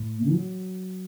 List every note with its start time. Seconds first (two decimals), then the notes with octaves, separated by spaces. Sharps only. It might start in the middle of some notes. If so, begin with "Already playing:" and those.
Already playing: A2
0.32 F#3